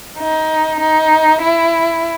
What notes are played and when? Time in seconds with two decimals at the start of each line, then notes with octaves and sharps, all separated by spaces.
0.18 D#4
0.79 D#4
1.41 E4